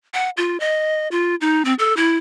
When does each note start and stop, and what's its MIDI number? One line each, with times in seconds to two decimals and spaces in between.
0.14 0.30 78
0.37 0.59 65
0.60 1.08 75
1.11 1.35 65
1.41 1.65 63
1.65 1.74 60
1.79 1.96 69
1.97 2.17 64